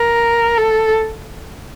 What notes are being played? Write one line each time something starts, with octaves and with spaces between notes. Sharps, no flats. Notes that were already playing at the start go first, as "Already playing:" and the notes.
Already playing: A#4
A4